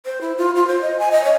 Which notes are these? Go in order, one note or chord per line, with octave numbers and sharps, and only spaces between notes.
C5
E4
F4
F4
C5
D#5
G#5
D#5
C#5